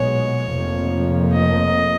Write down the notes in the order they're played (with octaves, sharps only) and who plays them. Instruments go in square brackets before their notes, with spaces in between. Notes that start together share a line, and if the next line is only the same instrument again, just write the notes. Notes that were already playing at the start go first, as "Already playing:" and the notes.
Already playing: [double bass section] B1 A#2 G#3 B3 [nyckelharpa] C#5
[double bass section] F1 F2 F3 A#3
[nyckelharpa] D#5